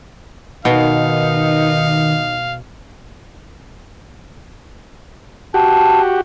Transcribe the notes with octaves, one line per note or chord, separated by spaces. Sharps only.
B2 D#3 D#4 F5
F#4 G4 A5